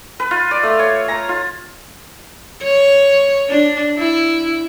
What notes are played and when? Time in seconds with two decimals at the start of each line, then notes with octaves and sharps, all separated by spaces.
0.20 B4
0.31 F4
0.51 D5
0.63 A3
0.79 C#5
1.08 A#5
1.29 F4
2.62 C#5
3.49 D4
3.98 E4